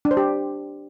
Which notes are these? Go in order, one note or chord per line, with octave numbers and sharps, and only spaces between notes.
D4
C5
G4